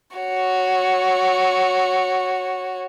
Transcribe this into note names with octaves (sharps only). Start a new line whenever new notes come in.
F#4 C#5